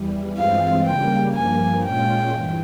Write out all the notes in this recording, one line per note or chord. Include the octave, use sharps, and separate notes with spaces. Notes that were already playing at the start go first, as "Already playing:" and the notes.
Already playing: E2 E3 G3
G2 E3 G#3 C4 F4 F5
C#3 G3 A#3 G5
G2 F3 A#3 G#5
A#2 G#3 C#4 F4 G5
G2 E3